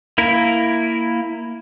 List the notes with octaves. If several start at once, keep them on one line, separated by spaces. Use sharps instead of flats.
A#3 E4 A#4